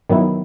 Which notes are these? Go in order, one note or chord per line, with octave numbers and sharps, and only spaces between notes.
D#3 F#3 B3 E4